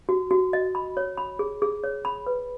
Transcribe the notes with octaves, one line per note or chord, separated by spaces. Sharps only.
F#4
F#4
D#5
B5
C#5
B5
G#4
G#4
C#5
B5
B4